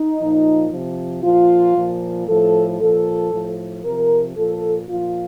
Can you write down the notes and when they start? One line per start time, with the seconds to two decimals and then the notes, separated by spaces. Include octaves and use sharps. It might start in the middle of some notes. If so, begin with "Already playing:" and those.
Already playing: D#4
0.19 A#2 F3
0.71 C3 F3
1.24 A#2 F3 F4
1.76 A#2 F3
2.28 A2 F3 A4
2.81 A#2 F3 A4
3.33 A2 F3
3.85 C3 F3 A#4
4.37 A#2 F3 A4
4.89 A#2 F3 F4